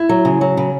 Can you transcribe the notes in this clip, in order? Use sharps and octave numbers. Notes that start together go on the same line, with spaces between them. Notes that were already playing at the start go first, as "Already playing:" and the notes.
Already playing: E4
F#3
C#3
F#3
C#3